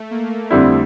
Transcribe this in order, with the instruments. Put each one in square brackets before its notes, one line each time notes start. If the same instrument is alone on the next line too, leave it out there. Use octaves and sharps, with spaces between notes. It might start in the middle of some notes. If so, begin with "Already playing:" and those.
Already playing: [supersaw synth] A3
A#3
[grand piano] F2 D3 G3 C4 E4 [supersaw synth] A3